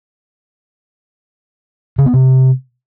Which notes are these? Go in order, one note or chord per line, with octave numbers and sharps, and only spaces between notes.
C#3
B3
C3